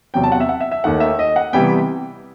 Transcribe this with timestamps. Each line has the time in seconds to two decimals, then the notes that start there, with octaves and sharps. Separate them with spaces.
0.14 E2 C3 F#3 G5
0.24 A5
0.32 F#5
0.40 E5
0.49 F#5
0.60 E5
0.71 E5
0.84 D#2 D#3 A3 F#5
1.00 E5
1.19 D#5
1.36 F#5
1.53 C3 E3 G3 B3 G5